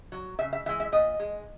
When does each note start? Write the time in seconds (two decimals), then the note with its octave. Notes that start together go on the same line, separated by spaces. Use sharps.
0.12 F#3
0.39 C#3 E5
0.53 E5
0.66 E3 E5
0.69 G#3
0.80 E5
0.92 A#2 D#5
1.20 G#3